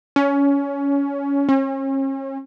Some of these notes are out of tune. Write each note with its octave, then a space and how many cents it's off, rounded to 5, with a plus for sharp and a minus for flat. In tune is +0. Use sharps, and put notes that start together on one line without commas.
C#4 +20
C#4 -40